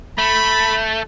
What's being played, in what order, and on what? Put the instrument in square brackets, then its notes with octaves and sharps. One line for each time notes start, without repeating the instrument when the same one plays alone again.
[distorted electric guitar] A3 [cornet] B5